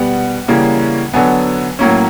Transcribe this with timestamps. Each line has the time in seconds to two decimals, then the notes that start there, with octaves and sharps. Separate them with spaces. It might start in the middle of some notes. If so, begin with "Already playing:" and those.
Already playing: B2 G3 B3 F#5
0.48 C#3 E3 G3 A#3 C#4
1.13 D3 F#3 B3 G#5
1.79 A2 F#3 A#3 C#4